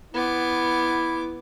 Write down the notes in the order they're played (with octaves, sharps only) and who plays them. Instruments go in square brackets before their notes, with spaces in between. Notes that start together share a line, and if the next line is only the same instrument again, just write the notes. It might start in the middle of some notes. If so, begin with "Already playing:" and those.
[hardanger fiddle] B3 D6 [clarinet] E4